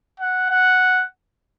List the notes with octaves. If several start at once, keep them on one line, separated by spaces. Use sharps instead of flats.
F#5
F#5